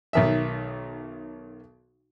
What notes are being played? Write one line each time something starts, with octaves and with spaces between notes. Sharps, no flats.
B1 D#3 E5